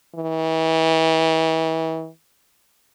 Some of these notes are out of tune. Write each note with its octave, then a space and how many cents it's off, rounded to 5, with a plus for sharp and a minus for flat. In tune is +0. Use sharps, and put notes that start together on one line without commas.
E3 -35